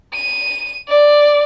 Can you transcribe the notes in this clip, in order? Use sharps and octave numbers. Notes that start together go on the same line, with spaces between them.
D#7
D5